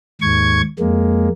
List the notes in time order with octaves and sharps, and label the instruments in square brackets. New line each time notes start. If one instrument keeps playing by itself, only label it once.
[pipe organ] D#2 G#2 C#6 G#6
F2 G#3 A#3